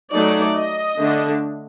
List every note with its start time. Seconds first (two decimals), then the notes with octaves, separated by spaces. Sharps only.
0.13 F#3 A3 D#4 D5
0.57 D#5
1.01 D3 A3 D4